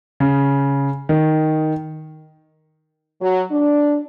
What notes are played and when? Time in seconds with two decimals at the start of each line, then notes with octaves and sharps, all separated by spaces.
0.20 C#3
1.09 D#3
3.21 F#3
3.51 D4